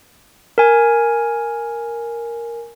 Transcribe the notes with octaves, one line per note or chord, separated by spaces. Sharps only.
A#4 G#5